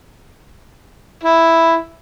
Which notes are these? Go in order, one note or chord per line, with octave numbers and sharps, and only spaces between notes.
E4